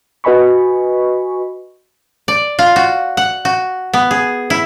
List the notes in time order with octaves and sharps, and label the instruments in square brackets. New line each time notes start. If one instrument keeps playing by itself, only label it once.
[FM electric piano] F#4 B4 D#5 G#5 B5 C#6
[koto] D5
F4
F#4
F#5
F#4
B3
G#4
E4